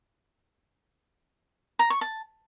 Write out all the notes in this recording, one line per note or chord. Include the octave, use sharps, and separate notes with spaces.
A#5
C#6
A5